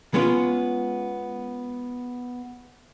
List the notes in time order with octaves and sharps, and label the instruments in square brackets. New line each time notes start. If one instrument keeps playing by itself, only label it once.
[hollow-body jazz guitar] G#3 B3 C#4 F4